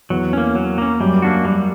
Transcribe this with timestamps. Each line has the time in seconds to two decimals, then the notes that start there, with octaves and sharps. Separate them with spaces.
0.10 E2 E3 F#3
0.33 A#3 C#4
0.55 F#3
0.78 A#3 C#4
1.00 F#2 F#3 G3
1.22 A#3 D4 F#4
1.45 G3